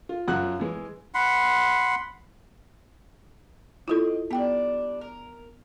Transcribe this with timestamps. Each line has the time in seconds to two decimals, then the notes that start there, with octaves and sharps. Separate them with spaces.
0.09 F4
0.28 F#2 C#3 F3 F#4 F#5 F#6
0.60 E3 G#3
1.14 F#5 B5 C6
3.88 C4 E4 F4 A4 D#5
4.31 G3 B3 D4 G5
5.01 A#4